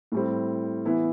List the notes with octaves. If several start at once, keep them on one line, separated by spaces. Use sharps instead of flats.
A2 G3 C4
E3 B3 E4